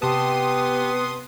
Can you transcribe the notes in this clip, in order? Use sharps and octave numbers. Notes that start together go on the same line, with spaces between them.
C3 B3 G4 A5 C6 D#6